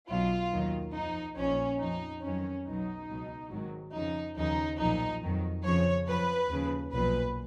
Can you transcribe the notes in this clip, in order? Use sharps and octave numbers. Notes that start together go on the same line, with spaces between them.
B1 B2 F#3 F4
D#2 D#3 F#3
F2 F3 D#4
A#1 A#2 F3 C#4
F2 F3 D#4
F2 D#3 F#3 C#4
B1 B2 F#3 D#4
C#2 B2 F#3
G#1 G#2 D#3 F#3
F2 C#3 F3 D#4
D#2 C#3 F3 D#4
B1 A#2 F3 D#4
F2 D#3 F#3
F2 C#3 F3 C#5
F#2 F3 B4
D#2 C#3 F3
B1 A#2 F3 B4